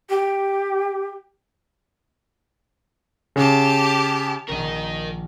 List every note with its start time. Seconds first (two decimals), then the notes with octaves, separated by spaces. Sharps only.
0.09 G4
3.36 C#3 G4 A5
4.48 A#1 D#3 D#4 A#4 D#5